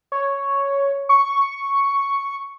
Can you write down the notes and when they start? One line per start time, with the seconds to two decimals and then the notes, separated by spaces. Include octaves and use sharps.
0.12 C#5
1.09 C#6